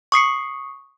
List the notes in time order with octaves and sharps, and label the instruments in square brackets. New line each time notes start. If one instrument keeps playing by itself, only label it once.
[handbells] C#6 D#6 C7 C#7